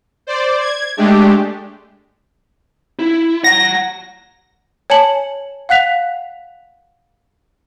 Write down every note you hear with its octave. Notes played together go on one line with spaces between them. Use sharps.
C5 D5
G#6
G#3 A3 D4 G4
E4
F#5 A#5 A#6
C#5 G#5 A5 C#7 F#7
F5 F#5 F#6 B6 F7